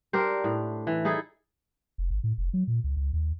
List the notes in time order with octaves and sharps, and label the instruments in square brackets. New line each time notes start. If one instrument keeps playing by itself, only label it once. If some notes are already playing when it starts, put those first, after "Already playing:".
[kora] D4 G4 A#4 C5
A2
E3
D#4 E4 G#4 A4
[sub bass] F1
G#1
A2
F1
F#3
A#2
C#2
C#2
D#2